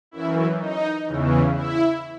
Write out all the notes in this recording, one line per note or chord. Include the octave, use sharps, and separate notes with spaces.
F#2 E3 E4
D#4
E2 C#3 E3
E4